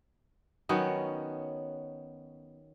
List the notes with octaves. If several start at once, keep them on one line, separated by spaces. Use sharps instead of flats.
D#3 F#3 B3 C#4